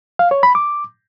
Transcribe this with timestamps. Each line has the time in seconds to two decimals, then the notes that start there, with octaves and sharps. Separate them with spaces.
0.19 F5
0.31 C#5
0.43 B5
0.55 D6